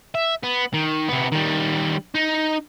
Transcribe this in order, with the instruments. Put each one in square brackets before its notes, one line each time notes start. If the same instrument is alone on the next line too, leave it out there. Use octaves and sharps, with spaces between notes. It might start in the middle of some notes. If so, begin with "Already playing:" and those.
[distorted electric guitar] E5
B3
D#3
C3 B3
D#3 G3
D#4